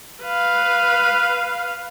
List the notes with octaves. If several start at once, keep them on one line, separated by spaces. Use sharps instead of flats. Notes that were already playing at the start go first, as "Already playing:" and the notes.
B4 F5